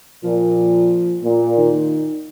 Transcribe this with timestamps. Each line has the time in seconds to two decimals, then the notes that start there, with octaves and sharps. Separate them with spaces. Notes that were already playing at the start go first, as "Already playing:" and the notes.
0.24 A#2 F3
1.24 A#2
1.57 D#3